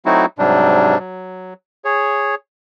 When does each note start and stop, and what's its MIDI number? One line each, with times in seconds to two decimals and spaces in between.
0.06 0.26 54
0.06 0.26 57
0.06 0.26 60
0.06 0.26 63
0.06 0.26 64
0.06 0.26 66
0.39 0.98 44
0.39 0.98 48
0.39 0.98 54
0.39 0.98 55
0.39 0.98 62
0.99 1.54 54
1.85 2.35 68
1.85 2.35 73